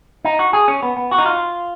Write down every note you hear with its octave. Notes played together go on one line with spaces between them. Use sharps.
D#4
F#4
G#4
C#4
B3
B3
F#4
D#4
F4